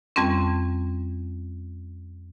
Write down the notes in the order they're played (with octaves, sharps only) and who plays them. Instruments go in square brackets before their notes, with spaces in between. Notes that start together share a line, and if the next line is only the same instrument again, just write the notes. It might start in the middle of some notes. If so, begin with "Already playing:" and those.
[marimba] F2 G3 C4 C#4